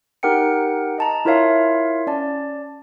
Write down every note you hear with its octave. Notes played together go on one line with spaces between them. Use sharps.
D#4 G4 A#4 F#5 G5 C#7
D#5 A5 A#5
E4 F4 A#4 C#5 E5 F5
C#4 D5 A5